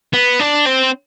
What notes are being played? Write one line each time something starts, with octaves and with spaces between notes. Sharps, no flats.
B3
D4
C4